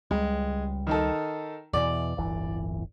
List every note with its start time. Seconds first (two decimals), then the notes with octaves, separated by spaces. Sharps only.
0.11 C#2 G3 G#3
0.87 D#3 D#4 A4
1.73 E2 B2 E3 D5
2.17 D1 G1 E3